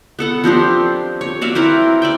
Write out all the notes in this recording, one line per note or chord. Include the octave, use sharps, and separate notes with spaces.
B3 A4 F#5
F3 C4 D4 G4
C#5
F#4 D5 E5 F5
C4 E4 A#4 B4
D5 E5 G5